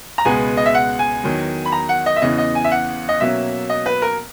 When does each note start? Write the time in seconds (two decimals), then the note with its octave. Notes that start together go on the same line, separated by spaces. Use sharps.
0.18 A#5
0.25 C#2 B2 G#3 B3 G#5
0.57 D#5
0.66 E5
0.74 F#5
0.99 G#5
1.23 E2 D#3 F#3
1.66 B5
1.72 A#5
1.89 F#5
2.06 D#5
2.16 E5
2.22 E2 C#3 E3 B3 D#5
2.38 D#5
2.55 G#5
2.64 E5
2.71 F#5
3.09 D#5
3.20 B2 F#3 A#3 C#4 E5
3.70 D#5
3.86 B4
4.02 A#4